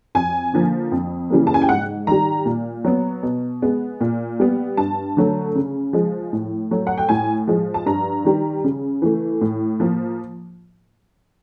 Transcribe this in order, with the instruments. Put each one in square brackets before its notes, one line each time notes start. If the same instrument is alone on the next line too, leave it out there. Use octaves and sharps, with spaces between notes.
[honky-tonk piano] F2 G#5
D3 F3 A#3
F2
C#3 E3 G3 A#3
A5
G#5
G5
G#2 F#5
D#3 G3 A#5
A#2
F#3 B3
B2
G#3 B3
A#2
G3 B3
G2 A5
D3 F#3 A3
C#3
F3 G#3
A2
F#3 A3
F#5
G5
A2 G#5
F3 G#3
A5
G2 A#5
D#3 G3
C#3
E3 A3
A2
F3 A#3